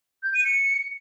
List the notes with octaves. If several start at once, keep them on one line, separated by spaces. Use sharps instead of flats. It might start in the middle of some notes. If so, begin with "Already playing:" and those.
G6
D#7
C#7